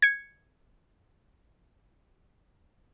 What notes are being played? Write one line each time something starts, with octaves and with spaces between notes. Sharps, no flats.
G#6 C#7